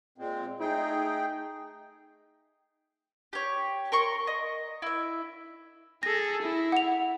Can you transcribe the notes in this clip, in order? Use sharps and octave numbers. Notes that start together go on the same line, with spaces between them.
A#2 G#3 C4
A3 D#4 G#4 G5
G4 C#5
A#4 C6 C#6
D#5
E4 E5
G#4 A4 A#6
E4
F#5 F7